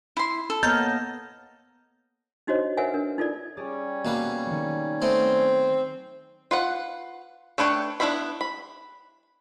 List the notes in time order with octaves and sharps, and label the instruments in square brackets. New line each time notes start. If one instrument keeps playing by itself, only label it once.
[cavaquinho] E4 C6
A4
[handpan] A#3 B3 D#5 [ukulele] C#5 A#5 [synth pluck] F6 G6 A6
[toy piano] D4 D#4 F#4 C5 C#5 D#5
A#4 B4 C#5 E5 F#5 G#5
D4 A#4
D#4 F4 A4 A#4 D5
[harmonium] G3 C#4 C#5 [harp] G4 G#4 D5
[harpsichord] B2 A#3 B4
[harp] D#3 F#3
[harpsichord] A3 B3 C5 [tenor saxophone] C4 [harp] D7
[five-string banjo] F4 B4 F#5
A3 D4 B4 C#5 G5
B3 D4 E4 C5 B5
B5